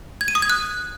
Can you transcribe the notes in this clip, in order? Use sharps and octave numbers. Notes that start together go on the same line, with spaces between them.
G#6
D#7
D#6
G#6
F#6